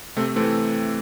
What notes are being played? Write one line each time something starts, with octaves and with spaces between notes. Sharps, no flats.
C3 A3 C4
E3 A3 C4